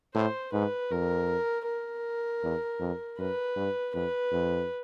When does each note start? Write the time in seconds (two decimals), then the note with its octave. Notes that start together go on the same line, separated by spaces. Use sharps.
0.15 A2 C5
0.53 G#2 B4
0.91 F2 A#4
1.66 A#4
2.43 E2
2.80 F2
3.18 F#2 B4
3.56 G2
3.94 F2 B4
4.32 F2